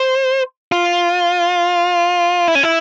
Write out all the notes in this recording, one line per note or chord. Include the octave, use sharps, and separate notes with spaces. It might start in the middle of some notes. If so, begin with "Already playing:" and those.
Already playing: C5
F4
E4
C#4
E4